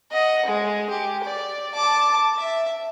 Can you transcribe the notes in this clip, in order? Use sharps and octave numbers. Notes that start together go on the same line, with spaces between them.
D#5 F#5
G#3
G4
D5
A5 D6
E5